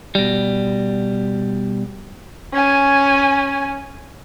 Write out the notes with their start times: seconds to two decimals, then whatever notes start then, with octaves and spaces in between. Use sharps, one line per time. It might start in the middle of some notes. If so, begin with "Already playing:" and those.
0.15 B2 G3
2.53 C#4 G#5